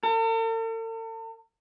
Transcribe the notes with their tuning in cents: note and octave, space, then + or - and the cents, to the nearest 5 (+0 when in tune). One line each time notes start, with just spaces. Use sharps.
A4 +45